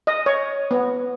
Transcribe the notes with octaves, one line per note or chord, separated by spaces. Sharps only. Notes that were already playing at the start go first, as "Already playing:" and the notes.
D#5
C#5
B3